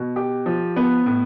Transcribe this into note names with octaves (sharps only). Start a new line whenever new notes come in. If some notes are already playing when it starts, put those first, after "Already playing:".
Already playing: B2
G4
F3
B3
A2